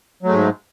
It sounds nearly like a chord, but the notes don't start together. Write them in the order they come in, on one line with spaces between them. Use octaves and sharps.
F#3 A3 G#3 G#2